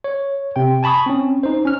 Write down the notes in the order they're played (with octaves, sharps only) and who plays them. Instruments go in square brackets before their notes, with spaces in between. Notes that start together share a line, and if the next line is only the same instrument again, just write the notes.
[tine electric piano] C#5
C3 G5
G#5 A5 B5 C#6 D#6
C4 C#4
D#4 C5
C#4 F6